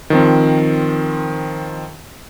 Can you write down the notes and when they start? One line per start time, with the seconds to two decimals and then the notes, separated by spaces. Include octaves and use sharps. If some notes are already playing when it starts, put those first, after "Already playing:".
0.10 D#3 F3 C4